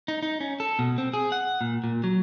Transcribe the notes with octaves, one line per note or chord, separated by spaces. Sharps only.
D#4
D#4
C#4
A4
B2
C4
G#4
F#5
A#2
A#2
F#3